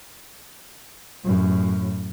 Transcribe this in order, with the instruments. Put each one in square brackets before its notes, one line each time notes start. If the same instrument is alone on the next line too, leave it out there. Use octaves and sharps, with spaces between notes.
[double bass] F#2 A2